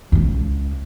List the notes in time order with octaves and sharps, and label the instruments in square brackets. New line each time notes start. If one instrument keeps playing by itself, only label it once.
[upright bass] C#2 G#3